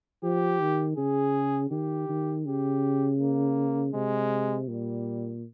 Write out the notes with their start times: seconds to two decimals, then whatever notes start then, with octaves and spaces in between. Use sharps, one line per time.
0.23 F3 G4
0.61 D#3
0.97 C#3 G#4
1.71 D#3 G4
2.09 D#3
2.46 C#3 G4
3.20 A#3
3.93 C3 G#3
4.68 A#2 G3